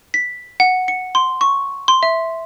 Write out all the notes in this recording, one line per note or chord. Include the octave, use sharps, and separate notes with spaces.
B6
F#5
C#7
C6
C#6
C6
E5